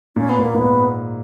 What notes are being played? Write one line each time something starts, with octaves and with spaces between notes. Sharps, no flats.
A#2 C#4
B3
A#2 A#3
A#2 B3
G#2